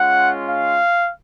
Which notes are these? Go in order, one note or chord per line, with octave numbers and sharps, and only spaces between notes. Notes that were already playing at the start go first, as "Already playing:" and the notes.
Already playing: G#3 C#4 F4 F#5
F5